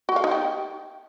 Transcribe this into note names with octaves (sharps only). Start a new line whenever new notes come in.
F#4
F5
D#4
G4